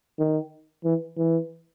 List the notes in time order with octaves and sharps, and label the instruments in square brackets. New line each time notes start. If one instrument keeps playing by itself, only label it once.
[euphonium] D#3
E3
E3